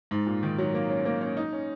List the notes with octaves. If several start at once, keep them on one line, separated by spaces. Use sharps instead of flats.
G#2
A#2
D#3
F#3
A#3
C#4
A#3
C#4
D#4
C#4